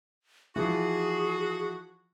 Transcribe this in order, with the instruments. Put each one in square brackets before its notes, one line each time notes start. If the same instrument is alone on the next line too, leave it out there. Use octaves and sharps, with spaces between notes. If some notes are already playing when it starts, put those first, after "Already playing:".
[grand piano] E3 F3 [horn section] F#4 [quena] G#4